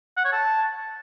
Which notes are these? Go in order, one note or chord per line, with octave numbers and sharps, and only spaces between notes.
F#5
C#5
A5